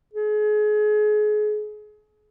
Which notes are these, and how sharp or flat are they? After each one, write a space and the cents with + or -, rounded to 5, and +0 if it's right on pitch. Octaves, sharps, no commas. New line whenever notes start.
G#4 +30